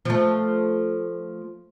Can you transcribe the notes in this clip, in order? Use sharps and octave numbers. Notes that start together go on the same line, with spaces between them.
F3 A3